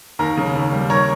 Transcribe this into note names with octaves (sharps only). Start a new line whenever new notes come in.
D#2 A#4
C#3
D#2
G3
D#2 A#4 C#5